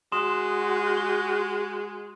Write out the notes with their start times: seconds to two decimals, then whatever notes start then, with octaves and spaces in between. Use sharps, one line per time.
0.12 G#3 F#4 C6 D#6 E7
0.97 G7